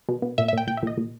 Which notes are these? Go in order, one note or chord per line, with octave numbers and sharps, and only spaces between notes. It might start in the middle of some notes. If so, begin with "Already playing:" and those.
B2
B2
A#2 E5
E5
A#2 G5
A#2 G5
E5
A#2 D#5
A#2